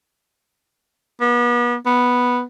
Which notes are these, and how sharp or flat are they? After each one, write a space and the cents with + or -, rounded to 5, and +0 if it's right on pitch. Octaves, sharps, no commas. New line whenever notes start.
B3 -40
B3 -5